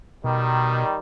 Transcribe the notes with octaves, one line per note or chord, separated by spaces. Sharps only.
B2 D#3 G3